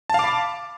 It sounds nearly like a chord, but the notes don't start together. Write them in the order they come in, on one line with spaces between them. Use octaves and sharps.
A5 F5 D6 B5